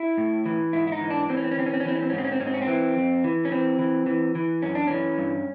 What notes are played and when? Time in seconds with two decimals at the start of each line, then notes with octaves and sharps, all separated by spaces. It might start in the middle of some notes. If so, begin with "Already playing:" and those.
Already playing: E4
0.18 A2
0.46 E3
0.73 G#2 E4
0.87 E4
0.92 D#4
1.01 E3
1.10 D4
1.29 E3 C4
1.37 C#4
1.44 C4
1.51 C#4
1.57 E3 C4
1.66 C#4
1.74 C4
1.80 C#4
1.85 E3 C4
1.95 C#4
2.02 C4
2.10 C#4
2.13 G#2
2.18 C4
2.24 C#4
2.32 C4
2.40 G#2 C#4
2.47 C4
2.54 C#4
2.62 C4
2.67 E3
2.96 F2
3.24 E3
3.45 C#4
3.51 E3 C4
3.79 E3
4.06 E3
4.35 E3
4.62 F#2 C#4
4.75 D4
4.87 E3 C#4
5.18 G2